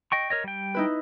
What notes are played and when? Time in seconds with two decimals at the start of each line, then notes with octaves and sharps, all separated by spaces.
0.12 D#5 G5 C#6
0.30 A#4 C#5 D#5
0.44 G3 G5
0.74 D#4 E4 B4